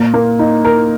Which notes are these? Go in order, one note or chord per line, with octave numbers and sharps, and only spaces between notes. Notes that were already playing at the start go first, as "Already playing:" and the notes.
Already playing: A#2
A#3
D#4
A#4